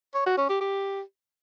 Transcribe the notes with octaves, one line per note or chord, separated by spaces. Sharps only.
C#5
F#4
C#4
G4
G4